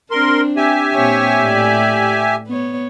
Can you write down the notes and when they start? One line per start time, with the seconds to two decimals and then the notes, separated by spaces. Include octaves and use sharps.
0.11 C4 D4 A#4 C6
0.57 G4 E5 G#5
0.94 A#2 C4 C#5
1.43 A2 D5
2.47 B3 C#5